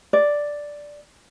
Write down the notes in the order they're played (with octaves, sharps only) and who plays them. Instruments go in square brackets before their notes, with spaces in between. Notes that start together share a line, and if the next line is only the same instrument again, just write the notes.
[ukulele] D5